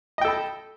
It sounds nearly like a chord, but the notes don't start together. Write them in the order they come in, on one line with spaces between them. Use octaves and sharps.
D#5 G5 A4 B5